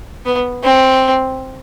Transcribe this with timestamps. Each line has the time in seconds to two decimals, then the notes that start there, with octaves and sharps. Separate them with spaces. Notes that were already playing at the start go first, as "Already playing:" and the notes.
0.25 B3
0.64 C4